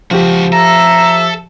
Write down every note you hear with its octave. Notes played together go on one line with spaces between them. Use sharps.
C#2 F3 F#4 G4
A4 E5 A#5